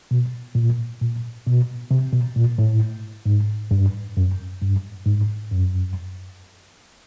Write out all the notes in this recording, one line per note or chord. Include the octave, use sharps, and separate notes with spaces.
B2
A#2
A#2
B2
C3
B2
A#2
A2
G#2
G2
F#2
G2
G#2
F#2